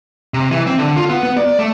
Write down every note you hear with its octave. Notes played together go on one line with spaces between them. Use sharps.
C3
E3
C4
D3
F4
B3
B3
D5
A3